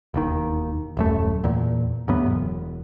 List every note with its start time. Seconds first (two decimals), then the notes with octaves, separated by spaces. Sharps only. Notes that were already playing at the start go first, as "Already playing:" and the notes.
0.14 E1 D#2 D#3
0.97 D#1 F#2 A3
1.44 E2 A#2
2.08 D2 G2 F#3 B3
2.26 E1